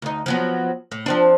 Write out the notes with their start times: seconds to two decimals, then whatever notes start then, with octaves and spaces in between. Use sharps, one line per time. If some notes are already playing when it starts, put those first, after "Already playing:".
0.02 D2 D#4
0.26 F3 F#3 B3
0.92 A2
1.06 F3 C4 D4